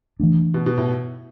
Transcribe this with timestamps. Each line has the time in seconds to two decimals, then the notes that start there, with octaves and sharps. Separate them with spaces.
0.20 E3 A3 D4
0.54 B2
0.66 B2
0.78 A2